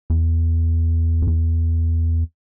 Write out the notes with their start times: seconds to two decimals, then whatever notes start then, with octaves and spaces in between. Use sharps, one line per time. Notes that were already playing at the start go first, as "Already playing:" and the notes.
0.10 E2
1.22 F2
1.27 E2